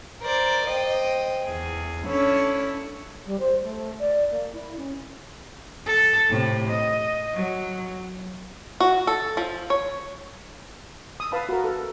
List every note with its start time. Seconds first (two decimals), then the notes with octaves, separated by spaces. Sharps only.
0.21 A#4 C5 D5
0.65 C5 D#5 G5
1.42 E2 G#4
2.05 C#4 D4 E4 A4 C#5
3.25 G3
3.39 C5
3.63 A3
3.99 D5
4.30 A#3
4.52 E4
4.76 C#4
5.87 A4
6.29 A2 C3
6.70 D#5
7.34 F#3
8.80 F#4
9.07 A4
9.37 F3
9.70 C#5
11.20 D#6 E6
11.32 B4 F5 A5 B5
11.49 F#4 A#4
11.64 A4